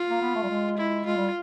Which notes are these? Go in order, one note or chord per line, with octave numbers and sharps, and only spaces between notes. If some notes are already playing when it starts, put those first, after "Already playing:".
Already playing: F4
A#3
B3
A3
G3
G#3
E4
G#3 F4
G3